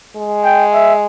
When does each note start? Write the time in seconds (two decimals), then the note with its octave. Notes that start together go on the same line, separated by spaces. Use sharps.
0.16 G#3
0.44 G5
0.73 E5